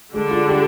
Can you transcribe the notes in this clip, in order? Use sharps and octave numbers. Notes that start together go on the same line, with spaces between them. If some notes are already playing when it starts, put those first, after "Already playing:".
D3 G3 G#3 D4
F4
G4